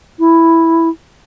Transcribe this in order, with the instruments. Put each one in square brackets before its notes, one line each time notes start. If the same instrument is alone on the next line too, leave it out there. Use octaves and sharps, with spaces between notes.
[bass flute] E4